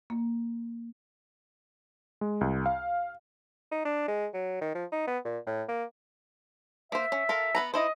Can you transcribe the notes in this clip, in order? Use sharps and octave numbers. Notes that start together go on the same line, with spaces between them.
A#3
G#3
C2
F5
D#4
D4
G#3
F#3
D#3
F3
D#4
B3
A#2
A2
A#3
A#3 C5 E5
C#4
F4 A4 A#4
B3 B4 A#5
D#4 E4 C5 D#5